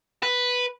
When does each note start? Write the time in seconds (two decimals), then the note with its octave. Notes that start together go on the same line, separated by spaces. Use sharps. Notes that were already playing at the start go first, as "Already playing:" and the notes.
0.23 B4